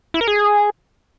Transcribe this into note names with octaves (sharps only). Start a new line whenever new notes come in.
E4
A#4
G#4